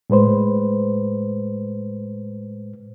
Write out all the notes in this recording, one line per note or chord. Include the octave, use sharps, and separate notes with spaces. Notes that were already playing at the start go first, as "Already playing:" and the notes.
A2 G#3 B4 C5